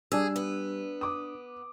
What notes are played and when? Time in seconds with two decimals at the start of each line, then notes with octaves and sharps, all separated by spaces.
0.12 G3 D4 G#4 E6
0.36 B3
1.01 D6 D#6